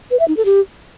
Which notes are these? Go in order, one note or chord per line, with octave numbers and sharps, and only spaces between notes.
B4
E5
D#4
A4
G4